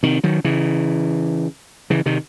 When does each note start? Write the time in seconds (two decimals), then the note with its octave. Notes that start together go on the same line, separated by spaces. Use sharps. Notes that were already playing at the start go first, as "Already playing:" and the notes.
0.03 C3 D#3
0.24 D#3 F#3
0.44 C#3 E3
1.90 C#3 E3
2.06 C3 D#3